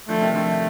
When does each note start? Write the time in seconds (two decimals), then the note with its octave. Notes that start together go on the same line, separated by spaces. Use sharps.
0.08 D3 F3 A3
0.21 C3 D#3
0.34 D3 F3 A3